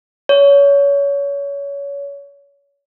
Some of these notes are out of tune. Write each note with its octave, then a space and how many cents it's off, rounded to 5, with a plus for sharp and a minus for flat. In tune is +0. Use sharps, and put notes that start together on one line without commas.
C#5 +25